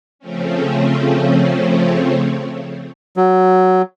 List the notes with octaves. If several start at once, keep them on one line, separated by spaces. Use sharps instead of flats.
C#3 F3 A3 C4 C#4
F#3